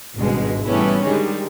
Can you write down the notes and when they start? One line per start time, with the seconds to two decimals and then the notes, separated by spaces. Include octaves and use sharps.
0.15 G#1 C#2 G2 B2 G#3
0.65 E3 G3 A3 B3 C#4 E4
1.05 D3 D#3 G3 G#3 D#4